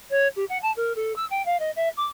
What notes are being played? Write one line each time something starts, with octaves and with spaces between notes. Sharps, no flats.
C#5
G4
F#5
A5
A#4
A4
E6
G5
F5
D#5
E5
D6